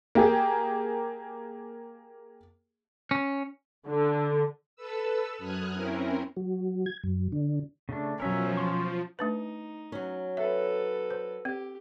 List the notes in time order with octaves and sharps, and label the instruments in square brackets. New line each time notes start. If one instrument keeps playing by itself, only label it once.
[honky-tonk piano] A#3 G4 G#4
[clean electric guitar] C#4
[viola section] D3
[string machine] A4 B4 E6
F#2 D#6 F6 F#6 G#6
C4 C#4 E4 A#4
[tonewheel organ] F#3
G#6
F#2
D3
[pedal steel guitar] C#3 A3 D4
[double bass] B2 F#3 [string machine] F3 [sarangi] C#4 [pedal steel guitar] A#4 E5 A#5
[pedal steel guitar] C6 C#6
[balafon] A3 D4 B4 [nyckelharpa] D#4
[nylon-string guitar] F#3 C#4
[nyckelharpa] A4 B4 [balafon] E5
[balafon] C5
[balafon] C4 [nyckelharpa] G4